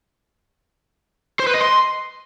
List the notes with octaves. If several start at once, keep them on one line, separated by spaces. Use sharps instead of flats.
C5
B4
D#5
C6